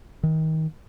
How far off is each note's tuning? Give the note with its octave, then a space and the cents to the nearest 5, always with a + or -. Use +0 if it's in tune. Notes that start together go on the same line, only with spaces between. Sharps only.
D#3 +30